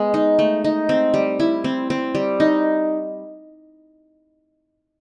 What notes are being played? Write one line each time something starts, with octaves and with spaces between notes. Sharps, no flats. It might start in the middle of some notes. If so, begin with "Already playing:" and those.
Already playing: G#3 B3
D#4
A3
D#4
C4
G3
E4
C4
C4
G3
D#4